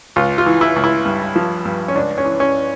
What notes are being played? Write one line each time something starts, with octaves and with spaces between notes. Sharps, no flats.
C#2 F4
F4
E3
E4
C#2
E4
G2
F3
G2
C#4
C#2 D4
C#4
E3
C#4